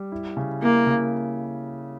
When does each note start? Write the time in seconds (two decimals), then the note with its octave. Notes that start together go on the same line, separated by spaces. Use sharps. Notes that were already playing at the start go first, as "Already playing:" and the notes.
Already playing: G3
0.12 E4
0.37 C#3
0.62 A#3 E4
0.87 C#3